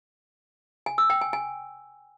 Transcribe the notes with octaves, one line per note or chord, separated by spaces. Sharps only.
G#5
E6
G5
G#5
G#5